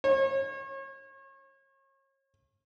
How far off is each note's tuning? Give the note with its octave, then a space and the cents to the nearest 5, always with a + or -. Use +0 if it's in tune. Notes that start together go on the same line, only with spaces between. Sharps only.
C#5 -35